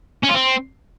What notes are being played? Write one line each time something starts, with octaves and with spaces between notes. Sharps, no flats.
C#4
F4
C4